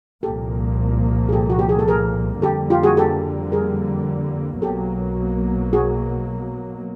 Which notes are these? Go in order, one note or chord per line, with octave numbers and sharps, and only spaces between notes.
C2 A#2 F3 A#3 G4 A4
G#4
G4 A4
F#4
G4
G#4
A4
G#4 A#4
F2 D3 G3 A#3 G4 A4
F4 G4
F#4 G#4
G4 A4
G#4 A#4
B1 B2 F#3 A#3 G4 A4
F#4 G#4